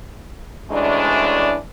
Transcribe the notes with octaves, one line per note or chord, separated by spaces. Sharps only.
D2 E3 G#3 C#4 D4